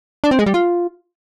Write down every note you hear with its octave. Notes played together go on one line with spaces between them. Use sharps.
D4
C4
G#3
G3
F4